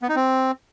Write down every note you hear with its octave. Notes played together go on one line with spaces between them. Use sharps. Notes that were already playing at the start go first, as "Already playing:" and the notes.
B3
D#4
C4